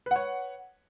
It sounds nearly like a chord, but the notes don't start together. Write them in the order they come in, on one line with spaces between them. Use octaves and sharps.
B4 F#5 C#5